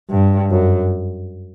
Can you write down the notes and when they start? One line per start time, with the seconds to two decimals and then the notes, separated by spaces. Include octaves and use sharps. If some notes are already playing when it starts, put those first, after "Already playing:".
0.10 G2
0.51 F#2